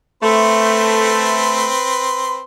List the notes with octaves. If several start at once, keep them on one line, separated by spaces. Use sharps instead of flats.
A3 C4 B4 C6